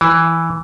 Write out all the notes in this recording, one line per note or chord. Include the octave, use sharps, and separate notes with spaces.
E3